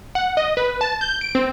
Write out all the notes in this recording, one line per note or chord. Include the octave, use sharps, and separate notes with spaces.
F#5
D#5
B4
A5
G6
D7
C4